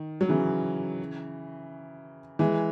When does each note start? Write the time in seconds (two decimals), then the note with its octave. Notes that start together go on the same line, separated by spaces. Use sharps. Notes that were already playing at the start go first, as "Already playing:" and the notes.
Already playing: D#3
0.21 F#3
0.29 C#3 E3
2.39 E3 G#3